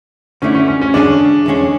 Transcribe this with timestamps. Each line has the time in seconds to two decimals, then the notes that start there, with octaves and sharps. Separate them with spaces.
0.42 D3 A3 C#4 E4
0.55 C#4
0.68 C#4
0.81 C#4
0.94 E2 D3 G#3 C#4 D4 G#4
1.46 E2 D3 G#3 C#4 G#4